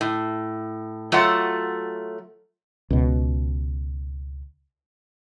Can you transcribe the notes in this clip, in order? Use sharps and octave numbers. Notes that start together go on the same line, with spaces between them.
A2
F#3 A3 F4 A4 F#5
C#2 B2